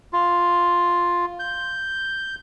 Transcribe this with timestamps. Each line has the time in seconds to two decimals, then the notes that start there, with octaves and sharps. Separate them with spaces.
0.13 F4
1.39 G6